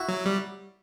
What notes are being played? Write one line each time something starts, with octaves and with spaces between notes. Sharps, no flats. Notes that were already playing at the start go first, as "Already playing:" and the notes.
Already playing: E4 F#4
F#3
G3